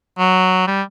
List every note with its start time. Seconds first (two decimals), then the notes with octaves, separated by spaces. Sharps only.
0.19 F#3
0.67 G3